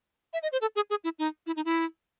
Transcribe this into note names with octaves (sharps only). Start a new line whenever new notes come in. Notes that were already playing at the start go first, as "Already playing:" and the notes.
E5
D#5
C5
A4
G#4
G#4
E4
D#4
E4
D#4
E4